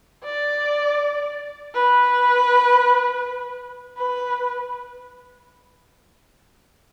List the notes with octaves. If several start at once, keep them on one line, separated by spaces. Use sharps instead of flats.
D5
B4
B4